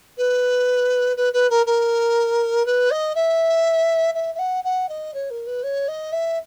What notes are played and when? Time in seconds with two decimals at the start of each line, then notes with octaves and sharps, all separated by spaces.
0.17 B4
1.17 B4
1.33 B4
1.50 A#4
1.66 A#4
2.65 B4
2.90 D#5
3.15 E5
4.14 E5
4.35 E5
4.39 F#5
4.64 F#5
4.89 D#5
5.13 C#5
5.30 A#4
5.46 B4
5.63 C#5
5.88 D#5
6.12 E5